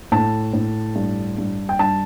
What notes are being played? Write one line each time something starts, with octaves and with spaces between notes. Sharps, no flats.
A2 A5
A2
G2
G2
G5
G2 A5